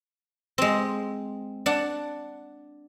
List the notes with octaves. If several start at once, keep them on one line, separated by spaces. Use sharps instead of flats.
G#3 C4
D4 F#5